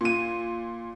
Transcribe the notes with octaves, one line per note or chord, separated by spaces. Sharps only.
A#2 D#7